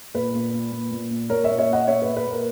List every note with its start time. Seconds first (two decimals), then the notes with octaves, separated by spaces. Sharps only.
0.14 A#2 B4
0.34 A#2
0.53 A#2
0.72 A#2
0.91 A#2
1.10 A#2
1.30 A#2 A#4 C#5
1.44 A#2 C#5 E5
1.59 C#5 E5
1.69 A#2 D#5 F#5
1.88 A#2 C#5 E5
2.02 A#2 B4
2.17 B4
2.26 A#2 A#4